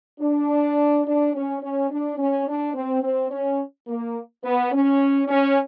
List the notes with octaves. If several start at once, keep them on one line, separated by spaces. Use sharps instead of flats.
D4
D4
C#4
C#4
D4
C#4
D4
C4
C4
C#4
A#3
B3
C#4
C#4